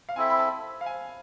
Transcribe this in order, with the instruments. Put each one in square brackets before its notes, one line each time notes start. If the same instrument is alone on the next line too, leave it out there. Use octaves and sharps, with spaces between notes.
[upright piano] F5
[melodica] C4 E4 A4 E5 [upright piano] G#5
[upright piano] B5
A5
F5
G#5